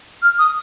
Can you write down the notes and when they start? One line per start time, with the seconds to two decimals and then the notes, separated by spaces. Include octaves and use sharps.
0.22 F6
0.38 D#6